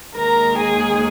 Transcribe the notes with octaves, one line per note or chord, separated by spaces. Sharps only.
D#2 D#3 G#3 A#4 A#5
G#4 G#5